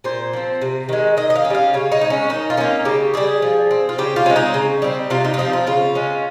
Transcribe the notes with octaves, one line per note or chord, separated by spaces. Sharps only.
A#2 C5
F3 C4
C3
D#3 G#3
D#3 D#5
D#5
F5
C#4
G3 F5
C#3 C#5
D#4
C4
G#3
C#4
D#3 D#4
F4
A#3 C#4 D#4
C#3 G4
G3 A#3 G#4
F3
C4
F4
C#3 G4
F4
G#3 C4 C#4
D#4
C#3
G3 C4 D#4
C3 F4
D#4
F4
F3 C4 D#4
F4
C#3 F4
G#3 C#4